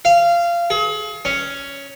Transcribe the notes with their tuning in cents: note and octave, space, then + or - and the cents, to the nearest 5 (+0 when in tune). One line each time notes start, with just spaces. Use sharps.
F5 -20
G#4 +40
C#4 +5